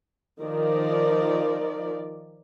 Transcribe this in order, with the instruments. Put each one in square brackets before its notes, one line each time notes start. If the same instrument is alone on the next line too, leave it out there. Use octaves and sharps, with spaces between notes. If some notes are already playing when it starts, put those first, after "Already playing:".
[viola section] D#3 F3 A#4 D5